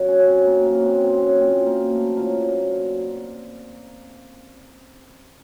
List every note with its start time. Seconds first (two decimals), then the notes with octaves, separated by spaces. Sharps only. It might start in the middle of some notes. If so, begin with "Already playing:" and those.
Already playing: F#2 D#3 F#3 F#4
0.08 C#4
0.20 C#4
0.27 C4
0.46 A#3
0.65 F#2 D#3 F#3 A#3
0.84 C4
1.03 C4
1.17 C4 C#4
1.41 A#2 F#3 C4
1.66 A#3
1.92 A3
2.17 A#2 F#3 A#3